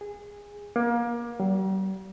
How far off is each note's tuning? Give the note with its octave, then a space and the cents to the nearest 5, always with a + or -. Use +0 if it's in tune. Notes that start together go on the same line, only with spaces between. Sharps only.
G#4 -20
A#3 +30
G3 -45